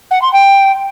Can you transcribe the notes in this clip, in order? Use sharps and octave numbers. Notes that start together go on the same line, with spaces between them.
F#5
C6
G5